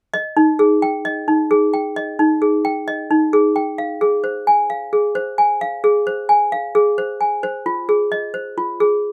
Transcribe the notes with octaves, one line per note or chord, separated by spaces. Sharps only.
D#5
D#4
G#4
G5
D#5
D#4
G#4
G5
D#5
D#4
G#4
G5
D#5
D#4
G#4
G5
F5
G#4
C5
G#5
F5
G#4
C5
G#5
F5
G#4
C5
G#5
F5
G#4
C5
G#5
C5
F4
G#4
D#5
C5
F4
G#4